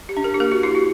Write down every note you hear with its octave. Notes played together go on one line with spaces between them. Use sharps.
G4
D4
A#4
G4
A#3 A#4
F#4
E4 G4
F#4